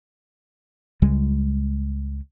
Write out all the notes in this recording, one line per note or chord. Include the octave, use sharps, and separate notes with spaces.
C#2 C#3 G3 G#3